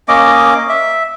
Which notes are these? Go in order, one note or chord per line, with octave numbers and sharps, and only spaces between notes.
A#3 C#4 D#5 D6
E5